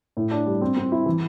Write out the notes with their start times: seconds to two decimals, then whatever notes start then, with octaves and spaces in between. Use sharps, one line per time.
0.17 A2
0.31 D4
0.46 G3
0.61 C4
0.77 C4
0.92 E4
1.06 E3